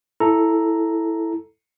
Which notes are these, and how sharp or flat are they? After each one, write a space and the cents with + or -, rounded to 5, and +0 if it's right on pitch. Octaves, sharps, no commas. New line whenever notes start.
E4 +0 A4 +0 A#5 +0